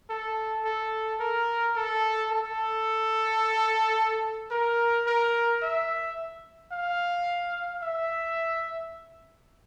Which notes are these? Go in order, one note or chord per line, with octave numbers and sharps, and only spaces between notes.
A4
A4
A#4
A4
A4
A#4
A#4
E5
F5
E5